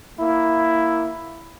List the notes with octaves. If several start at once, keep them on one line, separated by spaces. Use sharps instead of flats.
A#3 E4